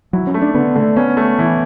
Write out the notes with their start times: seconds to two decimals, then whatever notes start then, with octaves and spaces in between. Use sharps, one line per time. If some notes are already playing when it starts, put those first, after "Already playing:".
0.13 F#3 E4
0.27 C#4
0.34 A3
0.42 D4
0.54 D3 B3
0.76 D3 A3
0.96 B3 C#4
1.17 A3
1.39 E3